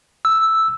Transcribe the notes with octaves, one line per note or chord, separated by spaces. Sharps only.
E6